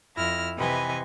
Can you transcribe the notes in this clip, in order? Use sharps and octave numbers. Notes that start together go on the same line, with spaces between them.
F2 E4 F6 A#6
C3 E3 B4 D#5 G#5